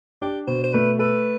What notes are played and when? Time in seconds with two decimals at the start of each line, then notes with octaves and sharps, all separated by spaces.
0.22 D4 G4
0.47 B2 C5
0.64 C5
0.73 A3 B4
0.99 A4 B4